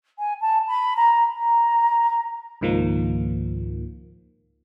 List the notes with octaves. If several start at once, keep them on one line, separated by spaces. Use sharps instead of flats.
G#5
A5
B5
A#5
A#5
C#2 G#2 D#3 F3 A#3